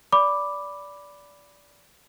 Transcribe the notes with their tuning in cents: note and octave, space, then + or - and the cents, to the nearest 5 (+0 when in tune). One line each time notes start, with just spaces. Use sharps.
D5 -20 B5 +0 D6 +0